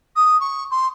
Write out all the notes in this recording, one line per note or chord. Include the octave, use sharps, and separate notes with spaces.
D#6
C#6
C6